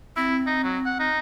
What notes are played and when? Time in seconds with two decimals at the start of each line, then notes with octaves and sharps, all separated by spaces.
0.16 C4 E4
0.47 D#4
0.64 F#3
0.86 F#5
1.00 D#4